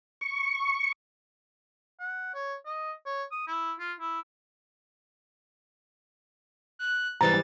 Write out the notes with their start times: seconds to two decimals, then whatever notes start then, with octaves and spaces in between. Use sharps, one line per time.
0.21 C#6
2.00 F#5
2.34 C#5
2.66 D#5
3.06 C#5
3.32 D#6
3.47 E4
3.79 F4
4.00 E4
6.79 F#6
7.21 G#2 E3 G3 A#5 A6